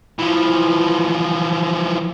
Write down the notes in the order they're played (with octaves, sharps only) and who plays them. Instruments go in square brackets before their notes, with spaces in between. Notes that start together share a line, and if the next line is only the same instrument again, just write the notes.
[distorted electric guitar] E3 F3